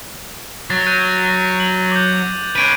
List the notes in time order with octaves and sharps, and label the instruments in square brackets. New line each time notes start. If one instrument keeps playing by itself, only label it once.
[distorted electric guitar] F#3 [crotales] A6
[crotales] F#6 G6 D#7
F#7
D6 G6
[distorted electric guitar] C#4 B4 [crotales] G#6 D7 D#7